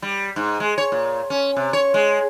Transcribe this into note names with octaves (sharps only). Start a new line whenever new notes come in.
G3
G#2
G#3
C#5
A#2
C#4
C3
C#5
G#3